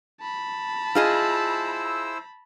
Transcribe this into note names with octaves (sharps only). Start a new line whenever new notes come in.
A5 B5
E4 F4 G#4 C5 D#5 E6